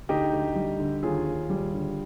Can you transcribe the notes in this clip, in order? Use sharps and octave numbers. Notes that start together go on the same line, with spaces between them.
D2 D#4 G4
D2
G3
D3
D#2 F4 G#4
D#2
G3
D3